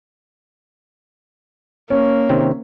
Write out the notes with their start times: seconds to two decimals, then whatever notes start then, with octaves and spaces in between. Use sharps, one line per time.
1.90 A#3 C#4
2.29 C3 D#3 C4